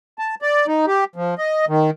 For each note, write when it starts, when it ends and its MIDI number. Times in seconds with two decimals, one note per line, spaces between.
0.19 0.35 81
0.42 0.66 74
0.68 0.86 63
0.87 1.04 67
1.16 1.35 53
1.38 1.65 75
1.68 1.90 51